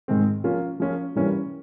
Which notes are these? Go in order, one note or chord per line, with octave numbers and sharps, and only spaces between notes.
G#2 D#3 G#3 C4
F3 A#3 C#4 F4
F3 A#3 C#4 F4
G2 E3 G3 A#3 C#4